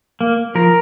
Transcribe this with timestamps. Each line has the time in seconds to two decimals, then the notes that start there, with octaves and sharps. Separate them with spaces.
0.21 A#3
0.55 F3 A#4